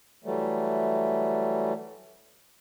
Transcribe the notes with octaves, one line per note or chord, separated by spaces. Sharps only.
E3 F#3 G3 A3